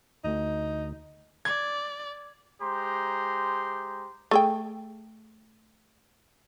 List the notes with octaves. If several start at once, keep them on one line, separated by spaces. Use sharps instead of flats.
D2 D#4
D5 G#6
G#3 G4 C5 A#5 C6
A3 G#4 G5